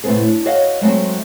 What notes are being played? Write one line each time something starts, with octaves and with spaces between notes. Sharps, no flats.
A2 C3 B3 C4 G#4
D4
F#4 C#5 D#5 F5 F#5
F#3 G#3 A3 C4 F#4